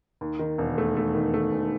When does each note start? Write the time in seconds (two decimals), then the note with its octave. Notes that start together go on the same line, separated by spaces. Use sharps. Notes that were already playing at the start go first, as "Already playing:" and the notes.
0.21 D#2
0.39 D#3
0.58 E1
0.78 A3
0.97 A3
1.15 D#3
1.34 A3
1.52 E1